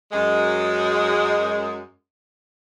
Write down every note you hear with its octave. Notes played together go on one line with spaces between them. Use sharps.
F#2 G#3